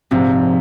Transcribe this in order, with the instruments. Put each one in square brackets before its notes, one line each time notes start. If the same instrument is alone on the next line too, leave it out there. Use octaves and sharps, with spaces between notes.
[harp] A#1 G#2 F3 [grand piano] C3